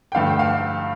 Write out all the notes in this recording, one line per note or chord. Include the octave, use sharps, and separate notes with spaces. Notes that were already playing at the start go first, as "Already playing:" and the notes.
G5
G2 D3 A3 F5
G5
F5